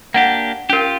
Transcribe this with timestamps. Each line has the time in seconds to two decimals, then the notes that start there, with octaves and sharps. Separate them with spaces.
0.14 A#3 D4 G4 F#5
0.70 C#4 F4 G4 A#4